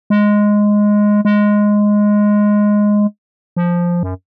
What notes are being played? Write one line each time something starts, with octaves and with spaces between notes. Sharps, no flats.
G#3
G#3
F3
F#2